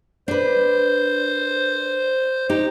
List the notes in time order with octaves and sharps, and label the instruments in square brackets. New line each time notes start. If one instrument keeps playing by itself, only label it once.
[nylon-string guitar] D4 B4 [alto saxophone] C5
[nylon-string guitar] D#4 [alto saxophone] G4